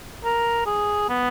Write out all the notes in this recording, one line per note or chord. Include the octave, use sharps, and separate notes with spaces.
A#4
G#4
B3